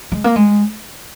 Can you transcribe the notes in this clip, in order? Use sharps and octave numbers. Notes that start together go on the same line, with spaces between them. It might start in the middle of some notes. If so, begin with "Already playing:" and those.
G#3
A#3
G#3